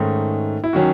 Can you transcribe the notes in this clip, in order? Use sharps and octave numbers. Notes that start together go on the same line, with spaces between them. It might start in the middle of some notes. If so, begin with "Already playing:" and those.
Already playing: G#2 D#3 A3 C#4
E4
D#3 F#3 C#4 F#4